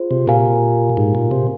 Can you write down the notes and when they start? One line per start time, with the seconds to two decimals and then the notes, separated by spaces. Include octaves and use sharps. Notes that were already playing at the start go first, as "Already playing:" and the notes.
Already playing: F4 G#4 C5
0.11 C3
0.27 A#2 G4 A#4 F5 G#5
0.97 G#2
1.15 A#2
1.31 C3